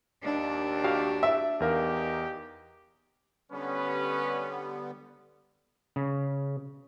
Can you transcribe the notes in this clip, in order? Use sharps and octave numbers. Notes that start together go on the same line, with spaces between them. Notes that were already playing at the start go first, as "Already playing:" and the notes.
D#2 D4
F#4 G4 F5
E5
E2 D#4 G4 A#4 F5
D3 G3 B3 C#4 B4
C#3